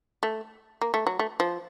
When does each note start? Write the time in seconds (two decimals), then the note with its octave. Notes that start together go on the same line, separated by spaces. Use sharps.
0.23 A3
0.82 A#3
0.94 A3
1.07 F#3
1.19 A3
1.40 F3